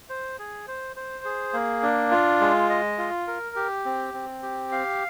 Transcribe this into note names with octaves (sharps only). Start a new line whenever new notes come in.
C5
G#4
C5
C5
G#4
A#3
D4
F4
G#3
D#5
F4
A#4
G4
C4
C4
G4
F5